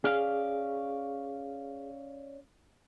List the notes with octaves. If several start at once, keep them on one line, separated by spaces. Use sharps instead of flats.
C#4 G#4 D5 F5